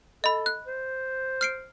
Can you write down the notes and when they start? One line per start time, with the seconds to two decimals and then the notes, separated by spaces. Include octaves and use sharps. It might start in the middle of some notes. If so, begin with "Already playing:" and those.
0.24 A4 D#5 B5
0.46 F#6
0.67 C5
1.41 F6 C7 D7